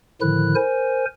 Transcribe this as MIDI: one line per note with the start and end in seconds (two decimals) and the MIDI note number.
0.21 0.54 45
0.21 0.54 50
0.21 0.54 51
0.21 0.54 53
0.21 0.54 64
0.21 0.54 90
0.55 1.05 70
0.55 1.05 72
0.55 1.05 80